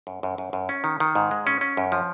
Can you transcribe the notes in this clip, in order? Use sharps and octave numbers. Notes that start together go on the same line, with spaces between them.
F#2
F#2
F#2
F#2
C#4
D#3
D#3
G#2
G#3
C#4
C#4
F#2
F3